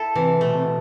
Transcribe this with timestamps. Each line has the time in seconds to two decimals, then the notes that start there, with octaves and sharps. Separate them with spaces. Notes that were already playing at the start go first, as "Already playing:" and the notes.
Already playing: E4 A4
0.16 C3 E3
0.41 B2 A3
0.54 C3
0.65 B2